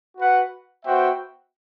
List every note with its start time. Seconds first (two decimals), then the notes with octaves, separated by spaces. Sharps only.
0.17 F#4 B4 F#5
0.84 B3 F#4 C5 E5 G5